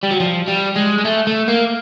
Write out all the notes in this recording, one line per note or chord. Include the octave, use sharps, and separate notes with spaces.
G3
F#3
F3
G3
G#3
G#3
A3
A3
A#3